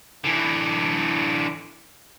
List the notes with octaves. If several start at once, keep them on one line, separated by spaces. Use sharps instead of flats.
D3 E3